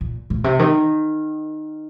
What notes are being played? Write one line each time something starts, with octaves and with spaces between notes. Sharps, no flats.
A#2
A#2
C3
D#3